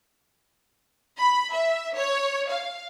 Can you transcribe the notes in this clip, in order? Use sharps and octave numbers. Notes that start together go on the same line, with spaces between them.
B5
E5
C#5
F5